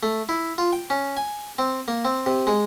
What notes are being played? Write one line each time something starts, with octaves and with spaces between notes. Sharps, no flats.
A3
E4
F4
G5
C#4
G#5
C4
A#3
C4
C3
G#3